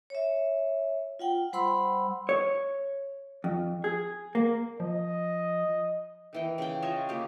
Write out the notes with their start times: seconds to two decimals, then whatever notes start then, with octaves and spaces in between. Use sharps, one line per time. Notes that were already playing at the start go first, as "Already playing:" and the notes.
0.10 C#5 E5
1.19 F4 F#5 G5
1.53 G3 C5 F#5 B5 C6 E6
2.29 C#5
3.44 F2
3.84 G#4
4.35 A#3
4.80 F3 D#5
6.33 D#3 E3 G5
6.58 C#3 G5
6.82 F4 C#5 D#5 E5
7.09 A#3 G4